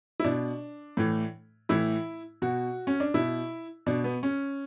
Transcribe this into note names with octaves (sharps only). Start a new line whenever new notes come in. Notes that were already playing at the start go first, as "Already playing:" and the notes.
E4
B2 D4
A2 E3
A2 E3 E4
B2 F#4
C#4
D4
B2 E4
B2 D4
B3
C#4